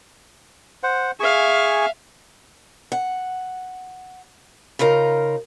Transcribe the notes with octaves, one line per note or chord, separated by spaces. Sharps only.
C5 F#5
G#4 E5 F5 G#5 C#6
F#5
C#3 D#4 F4 A#4